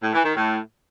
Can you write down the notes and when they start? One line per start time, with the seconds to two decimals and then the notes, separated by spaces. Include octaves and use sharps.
0.02 A2
0.13 E3
0.24 D#3
0.35 A2